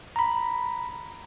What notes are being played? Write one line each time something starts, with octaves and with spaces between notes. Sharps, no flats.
A#5 B5